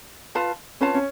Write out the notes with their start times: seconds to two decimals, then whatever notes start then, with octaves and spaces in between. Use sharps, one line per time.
0.35 F4 B4 F5 A5
0.81 C#4 F4 B4 F5 A5
0.95 C#4